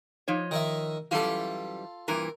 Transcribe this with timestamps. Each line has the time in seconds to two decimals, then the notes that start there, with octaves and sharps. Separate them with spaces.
0.28 F3 D#4 C#5
0.51 D#3 D#5 E5
1.11 F#2 E3 G3 F4 A4
2.08 G2 A#2 E3 A#4